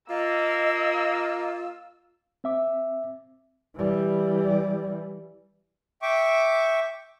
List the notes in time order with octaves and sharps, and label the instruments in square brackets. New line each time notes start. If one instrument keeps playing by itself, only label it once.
[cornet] A#3 [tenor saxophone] F4 [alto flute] D#5 [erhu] E6
[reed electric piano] C4 E5 D6
[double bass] E3 G3
[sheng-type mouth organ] E5 G5 C#6 D6